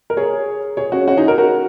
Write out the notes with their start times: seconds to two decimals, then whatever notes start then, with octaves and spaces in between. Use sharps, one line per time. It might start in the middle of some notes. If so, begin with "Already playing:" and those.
0.10 A#4
0.17 G#4 C#5
0.77 G#4 C#5
0.92 C#4 F#4
1.08 C#4 F#4
1.17 D#4 G#4
1.27 F#4 A#4
1.38 F#4 A#4